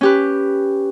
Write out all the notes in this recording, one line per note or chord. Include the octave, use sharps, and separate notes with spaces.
C#4 G4 B4